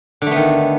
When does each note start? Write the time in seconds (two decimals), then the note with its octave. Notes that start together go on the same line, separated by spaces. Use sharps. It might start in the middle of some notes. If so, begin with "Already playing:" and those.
0.22 D3
0.26 A3
0.31 B3
0.36 D#3